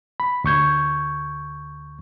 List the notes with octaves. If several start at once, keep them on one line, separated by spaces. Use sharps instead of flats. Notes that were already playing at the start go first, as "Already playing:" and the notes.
B5
D2 C#6 G6 G#6